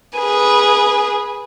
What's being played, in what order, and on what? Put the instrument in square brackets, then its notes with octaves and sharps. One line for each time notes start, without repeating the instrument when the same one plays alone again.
[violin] G#4 B4